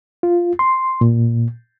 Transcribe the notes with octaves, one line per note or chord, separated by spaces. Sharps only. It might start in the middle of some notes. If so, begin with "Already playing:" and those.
F4
C6
A#2